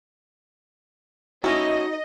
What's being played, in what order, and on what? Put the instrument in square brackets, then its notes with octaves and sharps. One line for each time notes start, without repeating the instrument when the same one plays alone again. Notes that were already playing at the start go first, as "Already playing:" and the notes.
[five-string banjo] A3 C#4 E4 [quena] D#4 [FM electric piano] F#4 [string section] D#5